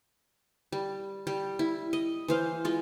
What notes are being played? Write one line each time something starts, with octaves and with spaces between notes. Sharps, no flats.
G3
G3
E4
D#5
E3 C5 F5
G#3 F4